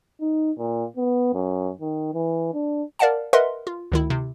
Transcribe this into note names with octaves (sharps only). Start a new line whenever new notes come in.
D#4
A#2
B3
F#2
D#3
E3
D4
A#4 D5 F5 F#5 A5
A#4 B4 D#5 E5 F#5 C6
F4
D2 D#3 E4
C3